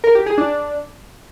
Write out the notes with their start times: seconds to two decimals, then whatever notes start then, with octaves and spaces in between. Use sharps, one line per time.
0.04 A#4
0.15 G4
0.26 G#4
0.38 D4